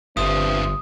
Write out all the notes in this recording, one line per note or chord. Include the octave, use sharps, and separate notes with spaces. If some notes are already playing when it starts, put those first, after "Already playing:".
G1 G2 F3 C4 B4 E5 D#6